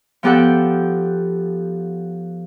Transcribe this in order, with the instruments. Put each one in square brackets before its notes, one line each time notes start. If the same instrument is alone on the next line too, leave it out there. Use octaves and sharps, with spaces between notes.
[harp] F3 B3 G4 A4 F#5 G5